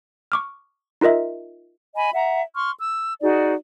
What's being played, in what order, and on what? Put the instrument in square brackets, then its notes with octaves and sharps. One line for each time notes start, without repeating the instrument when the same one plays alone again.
[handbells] C#6 D6 F6
D#4 F4 A#4 D#5 E5
[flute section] D#5 G#5 B5
E5 F#5 A#5
C6 C#6 F6
E6
D#4 F#4 G#4 D5